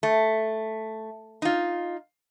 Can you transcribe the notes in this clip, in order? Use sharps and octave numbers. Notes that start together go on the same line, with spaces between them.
A3
D#4 F4